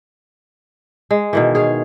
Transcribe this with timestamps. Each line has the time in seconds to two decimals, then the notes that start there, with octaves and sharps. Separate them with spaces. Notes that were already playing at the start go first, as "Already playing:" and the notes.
1.11 G#3
1.33 B2 D#3 E3
1.55 G#4 C#5 F5